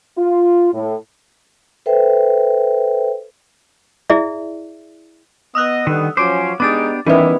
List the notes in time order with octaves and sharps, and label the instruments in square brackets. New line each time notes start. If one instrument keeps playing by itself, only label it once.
[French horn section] F4
A2
[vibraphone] A4 B4 C5 E5 G5
[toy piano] E4 G#4 D5 E5
[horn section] B3 D#5 [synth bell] D#6 E6 F#6
[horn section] D3 G3 B3 [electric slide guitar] D#3
[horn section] F3 F#3 C#4 [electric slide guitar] C5 [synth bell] D6 D7
[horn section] G#3 D#4 [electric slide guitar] B3 D4 G4 [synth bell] D6 A6
[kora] D#3 G3 B3 [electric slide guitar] E3 [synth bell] C#4 E5 [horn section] E4